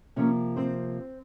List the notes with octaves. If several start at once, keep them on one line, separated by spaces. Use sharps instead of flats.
C3 F3 A#3 C#4 C#5
C4 C5